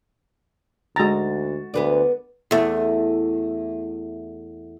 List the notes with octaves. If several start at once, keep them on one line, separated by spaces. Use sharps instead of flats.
D2 G#3 F#4 A#5 A6
D2 B3 B4 D5
E2 A3